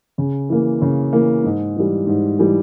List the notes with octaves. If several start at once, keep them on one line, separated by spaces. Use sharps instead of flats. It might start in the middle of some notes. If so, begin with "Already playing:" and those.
C#3
E3 A#3
C#3
E3 A#3
G#2
E3 G3
G#2
E3 G3